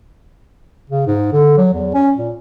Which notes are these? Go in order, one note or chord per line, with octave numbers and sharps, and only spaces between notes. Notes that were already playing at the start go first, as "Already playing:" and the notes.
C#3
G#2
D3
F#3
E2
C#4
A#2